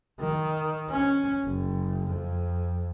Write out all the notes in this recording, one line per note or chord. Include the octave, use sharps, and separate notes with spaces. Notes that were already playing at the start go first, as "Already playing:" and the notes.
D#3
C#4
F#1
F2